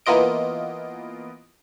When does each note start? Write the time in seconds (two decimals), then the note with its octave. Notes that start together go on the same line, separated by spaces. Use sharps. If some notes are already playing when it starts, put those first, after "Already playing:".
0.06 E3 A#3 B3 F4 D#5 D7